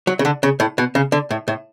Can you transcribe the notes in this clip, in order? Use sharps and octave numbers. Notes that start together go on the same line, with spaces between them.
F#3
C#3
D3
C#3
A2
B2
C#3
D3
A2
A2